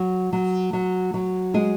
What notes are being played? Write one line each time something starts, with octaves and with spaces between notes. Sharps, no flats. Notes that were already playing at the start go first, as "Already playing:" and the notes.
Already playing: F#3
F#3
F#3
F#3
G#3 G#4